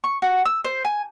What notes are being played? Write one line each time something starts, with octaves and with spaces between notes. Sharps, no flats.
C#6
F#4
E6
C5
G#5